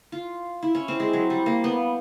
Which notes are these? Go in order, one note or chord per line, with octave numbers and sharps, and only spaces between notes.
F4
E4
C#4
C4
G#3
F#3
G3
A#3
B3